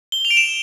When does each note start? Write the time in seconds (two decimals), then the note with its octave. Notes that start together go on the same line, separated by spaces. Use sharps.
0.12 G7
0.25 F7
0.31 D7
0.37 E7